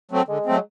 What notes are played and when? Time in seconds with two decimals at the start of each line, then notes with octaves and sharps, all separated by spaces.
0.11 F#3 A3 C4
0.28 D3 G#3
0.46 F#3 A3 C4